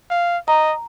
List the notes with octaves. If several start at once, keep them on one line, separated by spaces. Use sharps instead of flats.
F5
D#5 A#5